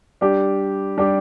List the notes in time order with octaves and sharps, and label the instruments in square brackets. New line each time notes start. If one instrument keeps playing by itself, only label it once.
[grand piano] G3 D4 G4
G3 D4 G4